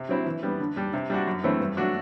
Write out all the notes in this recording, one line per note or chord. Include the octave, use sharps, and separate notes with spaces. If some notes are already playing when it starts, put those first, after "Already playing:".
Already playing: C3
F#3 C4 E4
E3
G3 B3
D3
G3 D4
C3
G3 D4 F#4
F#2
E3 A3 C4 E4
G2
F#3 A3 D4 F#4